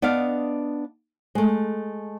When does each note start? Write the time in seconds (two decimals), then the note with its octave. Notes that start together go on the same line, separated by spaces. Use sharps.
0.02 B3 D4 D5 D#5 F5
1.35 G#3 A3